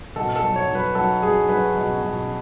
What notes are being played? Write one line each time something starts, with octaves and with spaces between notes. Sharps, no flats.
B2 A4
A4
F#3
C#5
F#3
B4
F#3 A4
F#3 G#4
F#3 B4
B2
B2